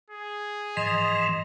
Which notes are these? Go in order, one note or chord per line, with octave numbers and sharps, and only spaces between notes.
G#4
G#2 E3 F3 D#5 C6 D#6